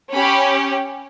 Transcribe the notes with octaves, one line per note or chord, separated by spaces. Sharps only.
C#4 G4 B5